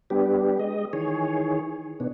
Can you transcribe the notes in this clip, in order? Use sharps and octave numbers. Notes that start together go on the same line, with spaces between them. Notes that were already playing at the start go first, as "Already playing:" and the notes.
G3 B3 D4 G4
G#3 D#5
D#3 E3 G#4 C#5
B2 B3 D4